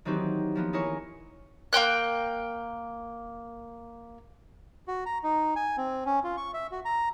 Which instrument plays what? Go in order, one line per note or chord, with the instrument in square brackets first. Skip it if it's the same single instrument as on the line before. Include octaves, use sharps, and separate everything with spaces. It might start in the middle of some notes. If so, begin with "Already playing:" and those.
[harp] D#3 E3 F#3 C4 D#4 G4
F3 A#3 B3
D#4 E4 G#4 A#4 C#5
[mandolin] A#3 C#4 G5 F#6
[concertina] F#4
A#5
D#4
G#5
C4
C#4
F4
C#6
E5
F#4
A#5